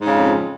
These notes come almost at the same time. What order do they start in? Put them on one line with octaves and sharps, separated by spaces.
G#2 C#3 F3 F2